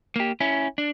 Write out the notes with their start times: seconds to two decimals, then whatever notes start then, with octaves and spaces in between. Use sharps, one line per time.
0.16 A#3 G4
0.40 C#4 E4
0.78 D4